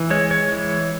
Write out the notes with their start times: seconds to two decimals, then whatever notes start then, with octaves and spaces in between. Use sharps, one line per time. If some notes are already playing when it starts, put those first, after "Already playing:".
Already playing: E3
0.10 G#3 C#5
0.31 C#5
0.52 E3